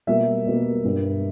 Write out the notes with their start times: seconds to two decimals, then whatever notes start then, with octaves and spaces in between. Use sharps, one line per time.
0.07 B2 G3 A#3 E5
0.46 B2 G3 A#3
0.84 G2 G3 A#3